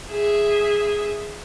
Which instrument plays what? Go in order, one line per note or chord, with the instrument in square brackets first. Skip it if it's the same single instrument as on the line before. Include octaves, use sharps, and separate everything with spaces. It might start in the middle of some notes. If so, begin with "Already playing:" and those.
[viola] G#4 E5